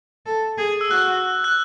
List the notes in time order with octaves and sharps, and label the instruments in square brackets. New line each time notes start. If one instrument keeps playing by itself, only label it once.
[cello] A4
G#4
[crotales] E6
[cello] F#4 [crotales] F#6
[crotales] F#6